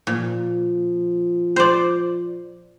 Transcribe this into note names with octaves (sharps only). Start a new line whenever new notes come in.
A#2 F3
C5 D5